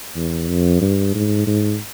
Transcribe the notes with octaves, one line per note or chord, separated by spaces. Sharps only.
E2
F2
G2
G#2
G#2